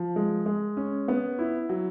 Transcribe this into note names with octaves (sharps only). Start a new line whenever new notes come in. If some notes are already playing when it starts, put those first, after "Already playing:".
Already playing: F3
G#3
G#3
C#4
B3
E4
F#3